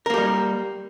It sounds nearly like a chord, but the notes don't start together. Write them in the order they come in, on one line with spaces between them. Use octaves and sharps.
A#4 A#3 G4 G3